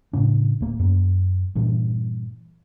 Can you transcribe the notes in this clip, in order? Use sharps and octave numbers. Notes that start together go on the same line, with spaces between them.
A2 C#3 D4
D1 A#3
F#2 A#3
G2 A#2 E3